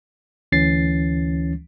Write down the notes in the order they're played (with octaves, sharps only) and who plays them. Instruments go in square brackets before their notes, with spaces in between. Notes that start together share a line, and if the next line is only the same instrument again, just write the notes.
[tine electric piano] D2 E3 C#4 A6 C7